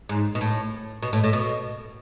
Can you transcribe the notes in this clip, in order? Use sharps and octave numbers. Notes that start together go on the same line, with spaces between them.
G#2
B2
A2
B2
A2
A2
B2